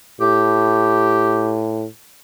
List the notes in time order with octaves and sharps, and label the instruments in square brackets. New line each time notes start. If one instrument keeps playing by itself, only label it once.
[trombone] A2 [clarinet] G4